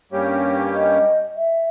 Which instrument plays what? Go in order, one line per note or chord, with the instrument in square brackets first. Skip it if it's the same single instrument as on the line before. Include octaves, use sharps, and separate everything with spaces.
[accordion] G2 G3 A#3 C#4 G4 [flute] C#5
[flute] D#5
E5